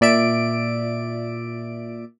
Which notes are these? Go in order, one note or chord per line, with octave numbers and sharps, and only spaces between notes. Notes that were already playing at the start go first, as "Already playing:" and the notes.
A#2 D5 E5 D7